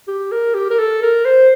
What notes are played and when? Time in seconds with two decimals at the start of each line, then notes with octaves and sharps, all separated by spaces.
0.08 G4
0.32 A#4
0.54 G4
0.70 A#4
0.79 A4
1.02 A#4
1.25 C5